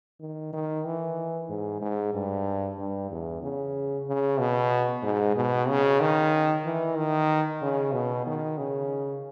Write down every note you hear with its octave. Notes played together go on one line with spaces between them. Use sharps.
D#3
D#3
E3
G#2
G#2
G2
G2
E2
C#3
C#3
B2
G#2
B2
C#3
D#3
E3
D#3
C#3
B2
D#3
C#3